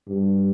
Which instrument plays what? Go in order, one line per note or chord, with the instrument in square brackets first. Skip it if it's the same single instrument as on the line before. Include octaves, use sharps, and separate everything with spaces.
[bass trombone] G2